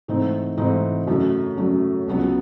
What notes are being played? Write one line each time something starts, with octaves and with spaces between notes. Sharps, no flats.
G#2 E3 A3 C4 D#4
G#2 E3 A3 C4 D#4
F#2 C#3 F#3 A3
F#2 C#3 F#3 A3
C#2 C#3 F#3 B3